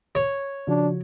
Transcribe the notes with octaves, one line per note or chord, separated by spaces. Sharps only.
C#5
C#3 F3 D4 F#4